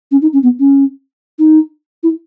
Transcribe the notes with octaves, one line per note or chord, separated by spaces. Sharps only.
C#4
D#4
C#4
B3
C#4
D#4
E4